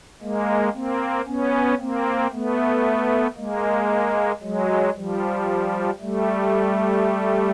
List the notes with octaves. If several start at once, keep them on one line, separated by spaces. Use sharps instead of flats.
G#3 A#3
A#3 C4
B3 C#4
A#3 C4
A3 B3
G#3 A#3
F#3 G#3
F3 G3
G3 A3